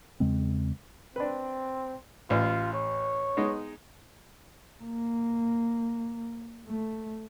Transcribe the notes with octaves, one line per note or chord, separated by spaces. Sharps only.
E2 C#3 G#3 C4
C4 D4 B4
A1 F4
C#5
G#3 B3 D#4
A#3
A3